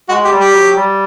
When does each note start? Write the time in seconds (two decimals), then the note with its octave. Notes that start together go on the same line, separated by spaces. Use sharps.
0.09 G#3 F#4
0.24 G4
0.31 G3
0.39 G4
0.54 F#3
0.76 G3